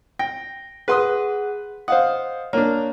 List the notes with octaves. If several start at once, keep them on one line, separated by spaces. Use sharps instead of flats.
G5 A#6
G#4 B4 F#5 C6 D#6
C5 D#5 F5 F#5 D#6
A#3 D4 C#5